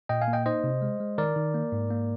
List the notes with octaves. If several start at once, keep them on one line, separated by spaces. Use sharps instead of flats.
A#2 D#5 G5
F5 G#5
A#3
D#5 G5
D#4 C5 D#5
C3
G#3
G#3
D#3 A#4 D5
D#3
A#3
G#2
A#3